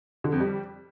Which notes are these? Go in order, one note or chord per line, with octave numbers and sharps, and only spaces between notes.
D3
F2
G3